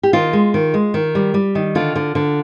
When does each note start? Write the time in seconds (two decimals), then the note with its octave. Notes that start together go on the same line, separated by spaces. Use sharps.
0.03 G4
0.13 D#3 F4
0.33 G#3
0.54 D#3
0.74 G#3
0.94 D#3
1.15 G3
1.34 G3
1.55 D#3
1.75 D3 F4
1.96 D3
2.15 D3